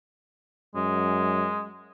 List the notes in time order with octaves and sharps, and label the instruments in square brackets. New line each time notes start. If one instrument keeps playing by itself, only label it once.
[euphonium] F#2 [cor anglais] G#3